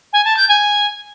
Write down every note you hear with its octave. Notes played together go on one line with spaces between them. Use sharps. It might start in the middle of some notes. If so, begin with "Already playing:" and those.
G#5
A5
G6
G#5